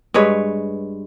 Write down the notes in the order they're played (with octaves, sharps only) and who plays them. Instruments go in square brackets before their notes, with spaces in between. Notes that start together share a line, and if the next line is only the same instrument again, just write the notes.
[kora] G2 G#3 B4 C#5